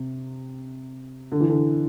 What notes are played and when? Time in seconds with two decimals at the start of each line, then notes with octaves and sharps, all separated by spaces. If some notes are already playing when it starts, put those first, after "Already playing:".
Already playing: C3
1.32 D3
1.40 E3
1.49 D3